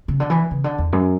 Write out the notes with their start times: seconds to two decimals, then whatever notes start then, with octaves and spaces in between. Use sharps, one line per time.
0.08 C#3
0.20 D3
0.30 E3
0.51 C#3
0.64 D3
0.78 E2
0.93 F#2